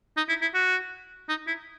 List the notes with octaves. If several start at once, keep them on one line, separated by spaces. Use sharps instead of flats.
D#4
E4
E4
F#4
D#4
E4